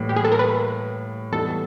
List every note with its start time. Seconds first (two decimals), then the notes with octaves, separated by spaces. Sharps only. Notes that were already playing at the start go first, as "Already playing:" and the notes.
Already playing: A2 E3 G3 A#3
0.09 G4
0.16 G#4
0.24 A4
0.32 A#4
0.39 B4
1.32 E3 G3 B3 D#4 A4